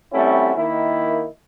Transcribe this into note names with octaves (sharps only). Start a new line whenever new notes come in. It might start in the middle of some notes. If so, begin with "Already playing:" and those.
G3 A3 C4 C#4 E4 F#4
D#3 A#3 E4